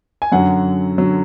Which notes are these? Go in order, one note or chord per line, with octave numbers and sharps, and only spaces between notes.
G#5
F#2 D3 F#3 F#5
D3 F#3